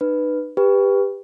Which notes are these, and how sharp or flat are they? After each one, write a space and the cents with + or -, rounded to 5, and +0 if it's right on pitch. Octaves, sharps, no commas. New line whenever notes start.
D#4 -40 B4 +0
G4 +20 B4 +0